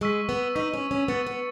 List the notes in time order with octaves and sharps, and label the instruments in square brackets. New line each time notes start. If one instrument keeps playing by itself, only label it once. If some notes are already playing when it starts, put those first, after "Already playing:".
[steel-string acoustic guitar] G#3 [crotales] C#6 E6 B6
[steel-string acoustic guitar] B3
[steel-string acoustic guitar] D#4 [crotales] C#6 E6 B6
[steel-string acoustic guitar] C#4
C#4
[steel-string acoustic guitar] B3 [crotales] E6 A6 C#7
[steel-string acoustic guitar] B3